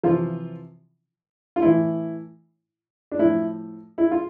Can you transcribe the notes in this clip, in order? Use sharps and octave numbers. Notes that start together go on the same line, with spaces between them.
C3 E3 F3 F4
F4
A2 E3 E4
D4
A2 F3 E4
E4
F4